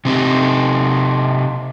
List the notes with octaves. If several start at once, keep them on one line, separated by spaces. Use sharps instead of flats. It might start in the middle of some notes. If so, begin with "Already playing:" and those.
C3 C4 D#4 G4